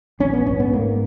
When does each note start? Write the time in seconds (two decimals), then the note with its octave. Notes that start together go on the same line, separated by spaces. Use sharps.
0.20 A#1 C#4
0.33 B3
0.46 G#2 C#4
0.60 B3
0.73 G#2 A#3